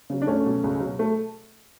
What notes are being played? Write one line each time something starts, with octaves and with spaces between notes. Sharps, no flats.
C#3 F#3
D4
C#2 A3 C#4
B2 F#3
C#2
B2 F#3
A3